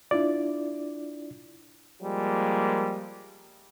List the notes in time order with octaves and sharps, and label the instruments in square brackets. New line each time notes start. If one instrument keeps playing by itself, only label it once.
[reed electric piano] D4 E4 F4 D5
[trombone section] F3 G3 G#3 A#3